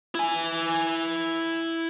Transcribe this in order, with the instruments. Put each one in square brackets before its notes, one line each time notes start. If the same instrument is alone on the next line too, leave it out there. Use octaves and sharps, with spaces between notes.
[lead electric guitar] E4 G#5